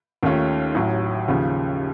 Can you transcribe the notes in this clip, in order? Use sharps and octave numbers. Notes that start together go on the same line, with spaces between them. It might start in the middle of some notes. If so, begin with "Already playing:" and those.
D#2 D#3 A3 C#4 F4
A1 A2 F#3
D#2 C#3 F3